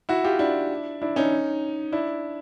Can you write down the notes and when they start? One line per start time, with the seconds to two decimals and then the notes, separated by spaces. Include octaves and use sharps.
0.09 E4 F#4
0.24 F4 G4
0.39 D4 E4
1.02 D4 E4
1.16 C#4 D#4
1.92 D4 E4